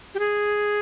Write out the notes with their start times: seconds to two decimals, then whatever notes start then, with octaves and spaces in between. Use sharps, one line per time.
0.15 G4
0.19 G#4